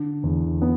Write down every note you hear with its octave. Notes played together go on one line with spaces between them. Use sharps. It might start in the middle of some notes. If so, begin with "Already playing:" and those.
Already playing: D3
E2
B3